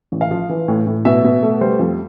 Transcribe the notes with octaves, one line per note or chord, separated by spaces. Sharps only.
A1
F5
F3
E3
A2
A2
B2 E5
B2
A3
G3 C5
F2